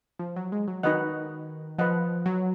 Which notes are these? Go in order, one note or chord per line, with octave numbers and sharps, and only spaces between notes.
F3
F#3
G#3
F#3
D#3 D#4 F#4 B4 D#5 F#5
F3 B4 D#5 F#5
F#3